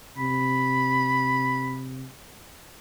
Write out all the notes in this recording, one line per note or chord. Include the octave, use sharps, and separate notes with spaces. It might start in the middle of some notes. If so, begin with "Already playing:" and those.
C3 B5